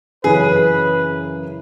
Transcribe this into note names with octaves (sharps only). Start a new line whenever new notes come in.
F#2 C#3 E3 G#4 B4